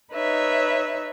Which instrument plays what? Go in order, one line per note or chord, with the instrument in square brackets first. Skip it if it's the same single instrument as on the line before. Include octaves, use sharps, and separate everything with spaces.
[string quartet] D#4 B4 C#5 E5